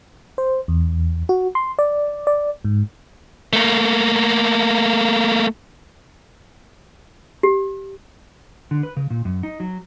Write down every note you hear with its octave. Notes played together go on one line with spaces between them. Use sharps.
C5
E2
F#4
C6
D5
D5
G#2
A3 A#3
G4
D3
B4
C#3
A#2
F#2
D#4
F#3